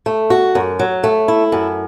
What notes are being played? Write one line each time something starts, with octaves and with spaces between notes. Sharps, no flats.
A3
F#4
F#2
F#3
A3
E4
F#2